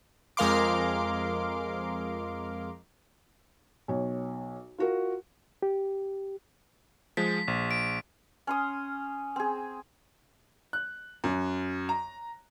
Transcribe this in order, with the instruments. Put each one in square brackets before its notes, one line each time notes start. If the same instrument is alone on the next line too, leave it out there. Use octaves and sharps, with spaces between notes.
[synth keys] F2 G#3 A#4 F5 C6 D6
[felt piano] B1 C#5
F4 F#4 A#4
[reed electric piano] G4
[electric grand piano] F3 G#3 [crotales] B6
[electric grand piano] A#1
[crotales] D7
[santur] C#4 C6 D#6
C4 G#4
[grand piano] F#6
F#2
A#5